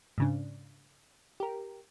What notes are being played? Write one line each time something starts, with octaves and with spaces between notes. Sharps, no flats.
G#2 C#3 D4
G4 A#4